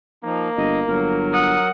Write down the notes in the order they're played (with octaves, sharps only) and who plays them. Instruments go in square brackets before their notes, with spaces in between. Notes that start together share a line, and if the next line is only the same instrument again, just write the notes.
[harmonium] F3 D#4 [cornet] A#3
[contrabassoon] G1 [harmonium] D#5
[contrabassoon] G1 [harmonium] F#3 A#4
[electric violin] F#5 D#6